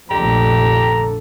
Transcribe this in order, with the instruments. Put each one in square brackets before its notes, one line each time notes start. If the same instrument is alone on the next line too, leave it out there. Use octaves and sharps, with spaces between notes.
[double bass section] F1 A#1 F2 [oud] D3 [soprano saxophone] G4 [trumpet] A#5